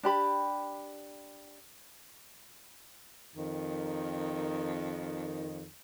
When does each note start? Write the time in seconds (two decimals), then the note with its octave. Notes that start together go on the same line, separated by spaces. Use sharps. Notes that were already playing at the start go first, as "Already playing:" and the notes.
0.03 D4 G4 B5
3.36 F2 D#3